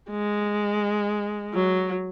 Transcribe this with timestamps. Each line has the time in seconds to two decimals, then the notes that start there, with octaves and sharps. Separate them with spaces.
0.11 G#3
1.53 F#3